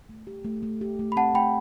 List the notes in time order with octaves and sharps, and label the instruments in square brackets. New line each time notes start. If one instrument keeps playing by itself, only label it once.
[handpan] A3
G4
A3
A3
G4
A3
[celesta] B5
[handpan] C4 [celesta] F#5 A5
[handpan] A3 [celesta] G5 B5